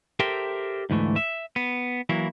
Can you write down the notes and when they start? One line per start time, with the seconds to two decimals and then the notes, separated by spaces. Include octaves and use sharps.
0.20 G4 A4 A#4 C5 E5 G5
0.90 D2 G#2 E3 A3
1.16 E5
1.56 B3
2.09 E3 F#3 A#3 E4